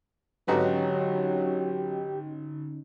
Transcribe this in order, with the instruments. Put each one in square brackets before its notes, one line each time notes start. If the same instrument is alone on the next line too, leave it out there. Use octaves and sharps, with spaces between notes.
[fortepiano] G#1 F#4 B4 [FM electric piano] D3 C#4 D#4 [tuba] F#3 [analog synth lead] G4